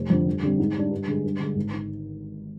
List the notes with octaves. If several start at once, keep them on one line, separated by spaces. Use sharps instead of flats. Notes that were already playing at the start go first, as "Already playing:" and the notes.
Already playing: F1
F2 D3
G2
D3 G3 C4
G#2
G3 D4
G2
D3 G#3
G2
D3 G#3
G#1
D#3